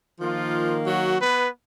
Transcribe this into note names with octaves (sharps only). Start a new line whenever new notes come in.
D#3 F3 A#3 F4
F#3 F#4
B3 B4